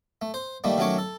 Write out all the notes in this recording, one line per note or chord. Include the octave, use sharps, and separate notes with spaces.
A3
C5
D#3 G3 A3 A#3
D#3 F#3 A3 C#4 C#5 D6
A4